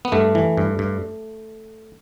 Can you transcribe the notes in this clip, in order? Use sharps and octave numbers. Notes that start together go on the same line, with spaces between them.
B3
G2 A3
E3
G2
G2